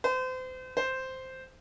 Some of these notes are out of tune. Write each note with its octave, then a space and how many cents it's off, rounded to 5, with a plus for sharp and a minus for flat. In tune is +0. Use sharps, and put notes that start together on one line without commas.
C5 -35
C5 -5